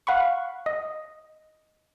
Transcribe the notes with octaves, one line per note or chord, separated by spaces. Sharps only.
F5 F#5 B5 C#6
D#5